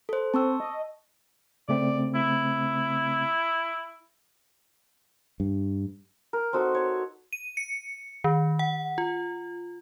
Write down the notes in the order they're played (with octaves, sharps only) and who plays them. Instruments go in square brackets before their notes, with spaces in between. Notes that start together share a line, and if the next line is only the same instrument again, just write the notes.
[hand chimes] A4 C5
[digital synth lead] C4 [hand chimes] A5 C#6 E6
[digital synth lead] D#5
[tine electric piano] C#3 A3 C4 [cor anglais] D5
[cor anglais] E4
[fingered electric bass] G2
[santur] A#4
C4 D#4 F#4 A4
C#5
[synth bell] D#7
C#7
D#3
F#5
F4